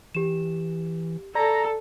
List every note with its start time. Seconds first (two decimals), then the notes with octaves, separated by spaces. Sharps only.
0.15 E3 G4 E7
1.35 A4 D5 A#5